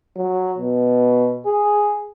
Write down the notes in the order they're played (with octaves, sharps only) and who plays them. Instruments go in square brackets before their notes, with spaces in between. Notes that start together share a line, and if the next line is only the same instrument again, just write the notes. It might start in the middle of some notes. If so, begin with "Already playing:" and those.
[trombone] F#3
B2
G#4